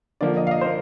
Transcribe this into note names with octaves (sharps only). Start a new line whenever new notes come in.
D3 F3 A#3 D5
D#5
F5
D#5
C5
A#3